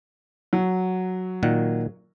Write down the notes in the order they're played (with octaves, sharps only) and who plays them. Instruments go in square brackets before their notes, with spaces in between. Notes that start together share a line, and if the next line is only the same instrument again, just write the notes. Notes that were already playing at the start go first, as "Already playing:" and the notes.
[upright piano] F#3
[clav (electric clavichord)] A#2 D#3 F#5